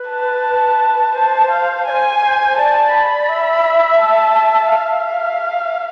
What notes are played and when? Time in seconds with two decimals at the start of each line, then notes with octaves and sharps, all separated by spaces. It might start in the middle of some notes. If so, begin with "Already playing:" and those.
Already playing: B4
0.10 A5
1.15 C5 A5
1.51 F5
1.86 D5 G#5
1.90 C5
2.57 D5 A5
2.94 B5
3.29 E5
4.00 A5
4.71 E5 F5